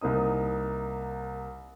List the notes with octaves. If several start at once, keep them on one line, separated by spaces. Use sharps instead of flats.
C2 A#3 D#4 D#6